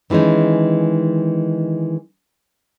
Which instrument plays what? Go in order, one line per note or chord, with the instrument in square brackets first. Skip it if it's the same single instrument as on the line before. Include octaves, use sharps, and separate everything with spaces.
[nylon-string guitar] D#3 E3 G#3 C#4 D#4